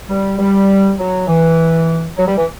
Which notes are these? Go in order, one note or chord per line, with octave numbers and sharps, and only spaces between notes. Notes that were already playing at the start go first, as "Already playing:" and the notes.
G3
G3
F#3
E3
F#3
G3
E3